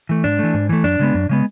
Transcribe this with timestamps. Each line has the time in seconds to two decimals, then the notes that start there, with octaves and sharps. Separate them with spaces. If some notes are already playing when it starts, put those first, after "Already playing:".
0.09 E3 A3
0.24 G#2 D4
0.39 E3 A3
0.54 G#2
0.69 E3 A3
0.84 F#2 D4
0.99 C#3 G#3 B3
1.14 F#2
1.29 C#3 G#3 B3